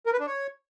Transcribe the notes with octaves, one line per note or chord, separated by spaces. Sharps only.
A#4
B4
D4
C#5